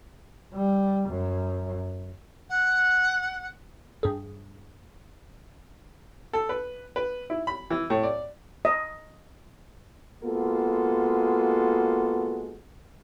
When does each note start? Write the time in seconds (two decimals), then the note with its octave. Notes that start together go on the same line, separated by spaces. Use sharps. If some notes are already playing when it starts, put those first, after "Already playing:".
0.54 G3
1.09 F#2
2.49 F#5
4.03 G2 G#4
6.33 A4
6.49 B4
6.96 B4
7.30 E4
7.47 B5
7.71 E3
7.90 A2
8.03 D5
8.65 D#5
10.22 G#3 A#3 B3 F4 F#4 A4